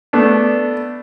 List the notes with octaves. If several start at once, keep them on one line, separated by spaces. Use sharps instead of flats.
A3 B3 D4